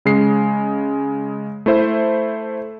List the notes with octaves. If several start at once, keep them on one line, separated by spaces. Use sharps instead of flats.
C#3 G#3 C7
A3 E4 C5 E5